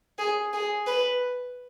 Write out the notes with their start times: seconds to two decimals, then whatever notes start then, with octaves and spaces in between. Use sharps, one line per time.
0.19 G#4
0.53 G#4
0.87 B4